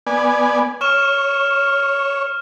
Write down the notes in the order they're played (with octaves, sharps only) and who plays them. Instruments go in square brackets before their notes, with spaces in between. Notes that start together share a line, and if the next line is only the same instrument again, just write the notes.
[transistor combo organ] B3 D5 G#5
[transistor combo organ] C#5 [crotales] C#6 F6 E7